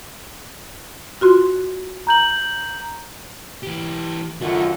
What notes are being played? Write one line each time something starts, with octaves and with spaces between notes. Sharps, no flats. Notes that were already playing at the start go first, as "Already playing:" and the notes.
F4 F#4 C6
A#5 G6 F#7
E3 G4
F#2 D3 D#3 A3 F4 F#4